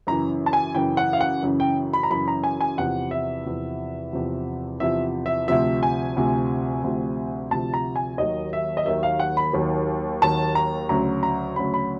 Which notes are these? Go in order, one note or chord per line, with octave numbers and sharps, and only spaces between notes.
F#2 C#3 E3 A#5
A5
G#5
F#2 C#3 E3 G5
F#5
F5
F#5
F#2 C#3 E3
G5
B5
A#5
F#2 C#3 E3 B5
A#5
G#5
G#5
E2 C3 F3 F#5
E5
E2 C3 F3
E2 C3 F3
E2 C3 F3 E5
E5
D2 C3 F3 E5
G#5
D2 C3 F3
D2 C3 F3
D2 C3 F3 A5
A#5
G#5
D#2 D#3 F#3 D#5
E5
D#5
D#2 D#3 F#3 E5
F5
F#5
B5
D#2 D#3 F#3
D#2 D#3 F#3 A5
A#5
D2 C#3 F#3 A#5
A#5
D2 C#3 F#3 B5
B5